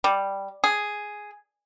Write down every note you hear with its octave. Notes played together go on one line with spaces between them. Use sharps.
G3
G#4